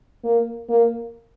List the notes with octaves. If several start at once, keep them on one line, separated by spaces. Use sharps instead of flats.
A#3
A#3